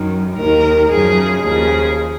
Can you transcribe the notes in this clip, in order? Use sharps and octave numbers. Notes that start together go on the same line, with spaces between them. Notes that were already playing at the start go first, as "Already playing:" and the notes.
Already playing: F#2 D#3
D#2 D#3 A#4
F#2 C#3 F3 G#4
D#2 C#3 F3 G#4